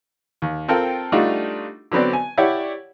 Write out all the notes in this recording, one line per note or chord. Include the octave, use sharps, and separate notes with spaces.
D#2
C4 F4 A4 A#4 G5
G3 A3 D4 D#4 F4 F#4
D3 F#3 B3 C4 D5
G#5
E4 G4 C#5 D5 F#5